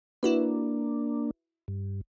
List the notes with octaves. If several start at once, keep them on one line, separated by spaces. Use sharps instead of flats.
A#3 D4 E4 F#4 B4
G2